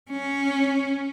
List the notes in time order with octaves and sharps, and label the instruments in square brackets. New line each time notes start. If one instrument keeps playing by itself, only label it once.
[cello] C#4